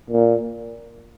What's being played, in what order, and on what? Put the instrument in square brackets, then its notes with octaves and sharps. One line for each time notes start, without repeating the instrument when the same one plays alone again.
[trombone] A#2